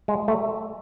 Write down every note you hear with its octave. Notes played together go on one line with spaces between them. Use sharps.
G#3
A3